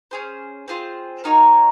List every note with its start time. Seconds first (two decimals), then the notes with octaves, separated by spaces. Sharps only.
0.11 C#4 G#4 C5
0.68 C4 F4 G#4 C5
1.24 A#3 D#4 F#4 C#5